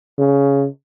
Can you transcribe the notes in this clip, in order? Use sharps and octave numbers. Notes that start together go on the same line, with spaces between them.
C#3